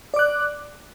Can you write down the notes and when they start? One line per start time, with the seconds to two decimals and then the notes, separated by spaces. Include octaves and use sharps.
0.14 D5
0.16 D6
0.19 F#6